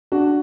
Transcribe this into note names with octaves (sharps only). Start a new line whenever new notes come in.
D4 F#4